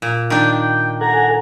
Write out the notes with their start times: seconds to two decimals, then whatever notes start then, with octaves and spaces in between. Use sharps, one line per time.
0.02 A#2
0.30 D#3 D4 G5
0.61 G5
1.01 A4 F#5 G#5 A#5